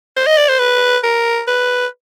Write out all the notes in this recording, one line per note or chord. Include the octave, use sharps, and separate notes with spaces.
C5
D#5
D5
C5
B4
A#4
B4